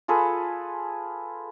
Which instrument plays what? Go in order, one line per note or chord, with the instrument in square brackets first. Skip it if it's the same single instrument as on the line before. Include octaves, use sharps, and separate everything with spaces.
[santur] F4 G#4 A4 B4